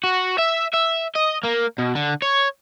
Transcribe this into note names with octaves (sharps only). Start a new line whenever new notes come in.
F#4
E5
E5
D#5
A#3
B2
D3
C#5